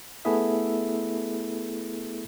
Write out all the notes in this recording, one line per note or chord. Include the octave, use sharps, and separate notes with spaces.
A3 B3 E4 G#4 A4 E5